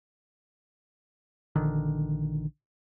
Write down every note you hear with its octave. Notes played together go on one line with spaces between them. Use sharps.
A#1 D3 D#3